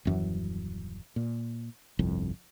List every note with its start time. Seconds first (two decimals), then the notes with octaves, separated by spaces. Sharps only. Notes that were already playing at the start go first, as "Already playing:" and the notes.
0.05 D#1 F#2 E3
1.16 A#2
1.99 G1 C2 F2